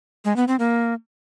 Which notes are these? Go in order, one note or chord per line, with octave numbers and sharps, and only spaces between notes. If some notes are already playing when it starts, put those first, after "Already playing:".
G#3
B3
C4
A#3